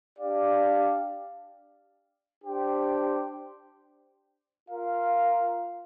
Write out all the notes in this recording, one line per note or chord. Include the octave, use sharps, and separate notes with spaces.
D4 G4 D5 F5
D4 G4 C5 G5
F4 A#4 F5